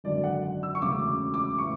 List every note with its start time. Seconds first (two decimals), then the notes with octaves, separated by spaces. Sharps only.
0.04 G#1 F#2 D3 D5
0.24 F#5
0.63 E6
0.75 C#6
0.82 E1 D2 C#3 D6
1.07 D6
1.34 D6
1.58 A2 E3 C#6